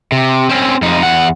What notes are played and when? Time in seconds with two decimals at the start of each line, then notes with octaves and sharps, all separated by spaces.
0.12 C3
0.49 C4 C#4
0.82 F2 D#4
1.03 E2 F#5